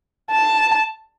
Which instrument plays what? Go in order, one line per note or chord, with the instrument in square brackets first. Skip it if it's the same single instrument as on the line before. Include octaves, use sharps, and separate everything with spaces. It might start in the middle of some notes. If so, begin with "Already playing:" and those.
[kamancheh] A5